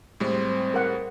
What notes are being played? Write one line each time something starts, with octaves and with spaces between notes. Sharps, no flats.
A2 G3 G#3 C4 C5
A#4 F#5